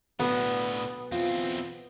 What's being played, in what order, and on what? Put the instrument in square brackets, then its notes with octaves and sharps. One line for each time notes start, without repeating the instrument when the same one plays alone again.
[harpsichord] B1 [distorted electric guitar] A2 D3 [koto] B3
[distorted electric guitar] E2 C4 [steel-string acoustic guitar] F4